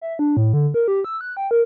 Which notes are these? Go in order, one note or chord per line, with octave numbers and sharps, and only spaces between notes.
E5
D4
A2
D3
A#4
G4
E6
F#6
G5
A#4